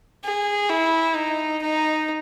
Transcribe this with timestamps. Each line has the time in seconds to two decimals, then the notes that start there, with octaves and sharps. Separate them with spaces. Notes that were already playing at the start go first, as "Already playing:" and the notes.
0.24 G#4
0.70 E4
1.16 D#4
1.61 D#4